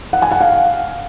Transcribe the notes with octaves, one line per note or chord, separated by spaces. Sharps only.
F#5
G#5
F#5
F5